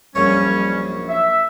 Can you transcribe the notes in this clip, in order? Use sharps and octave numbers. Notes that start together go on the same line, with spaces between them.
A#1 F#2 G3 C#4 C#5
E5